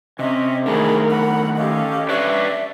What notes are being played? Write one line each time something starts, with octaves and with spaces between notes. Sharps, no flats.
C3 C#4 D#5 E5
D#3 A3 D4 G#4 A#4 B5
F#5 B5
C#4 G4 A4 D#5 F5
D4 B4 C#5 D5 E5